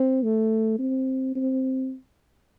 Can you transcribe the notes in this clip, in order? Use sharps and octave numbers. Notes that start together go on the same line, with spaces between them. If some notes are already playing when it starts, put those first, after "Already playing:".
Already playing: C4
A3
C4
C4